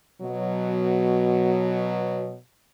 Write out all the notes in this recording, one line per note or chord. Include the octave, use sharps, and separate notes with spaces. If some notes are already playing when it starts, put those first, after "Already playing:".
B2 F#3